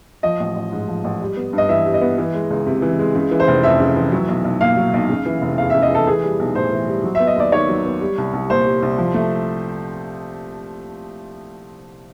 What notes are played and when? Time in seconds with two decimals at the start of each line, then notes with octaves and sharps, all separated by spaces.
0.23 F3 D#5
0.40 A1
0.56 A1
0.72 G#2
0.88 F3
1.04 A1
1.21 G3
1.37 B3
1.53 G2 D#5
1.69 E3 E5
1.86 G3
1.94 D#5
2.02 B3
2.18 E3
2.34 G#3
2.50 C#2
2.66 C3
2.82 E3
2.99 G#3
3.15 C#3
3.31 E3
3.40 C5
3.48 F1
3.63 F2 E5
3.79 C#3
3.96 E3
4.12 F#3
4.28 B1
4.44 B1
4.61 A#2 F5
4.77 F#3
4.94 B1
5.09 C#3
5.26 E3
5.42 F1
5.58 E2 F5
5.70 C#3 E5
5.82 D#5
5.91 E3 A4
6.07 E3 G#4
6.23 G3
6.39 B1
6.55 A2 C5
6.72 E3
6.88 G3
7.04 F#3
7.15 E5
7.20 B3
7.27 D#5
7.36 D#2 D5
7.52 D#3 C#5
7.69 F#3
7.85 B3
8.01 G3
8.18 C2
8.33 C2
8.50 A#2 C5
8.66 G3
8.82 C2
8.98 F3
9.14 A3